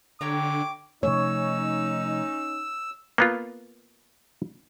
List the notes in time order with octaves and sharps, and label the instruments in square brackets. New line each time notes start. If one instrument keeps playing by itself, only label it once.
[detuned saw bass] D3 [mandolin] G4 C#5 A#5 [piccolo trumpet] D6
[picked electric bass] C3 F3 A3 [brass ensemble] C#4 D#4 [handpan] C#5 [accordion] E6
[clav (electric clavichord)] A#3 B3 F4